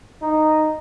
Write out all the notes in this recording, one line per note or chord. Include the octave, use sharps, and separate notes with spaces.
D#4